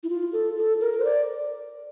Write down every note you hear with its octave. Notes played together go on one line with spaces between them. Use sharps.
E4
F4
A4
A4
A#4
C5
D5